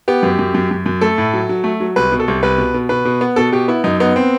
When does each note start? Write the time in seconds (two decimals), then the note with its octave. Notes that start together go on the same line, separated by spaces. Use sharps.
0.08 B3 G4
0.23 F#2
0.39 F#2
0.54 F#2
0.71 F#2
0.86 F#2
1.01 A3 A4
1.18 A2
1.34 F#3
1.49 F#3
1.64 A3
1.80 F#3
1.96 C2 B4
2.12 B2
2.20 A4
2.28 C2
2.43 C2 B4
2.58 B2
2.74 B2
2.89 B2 B4
3.05 B2
3.21 B3
3.36 B2 A4
3.52 B2 G4
3.68 B3 E4
3.84 F#2 D#4
4.00 B3 D#4
4.16 C4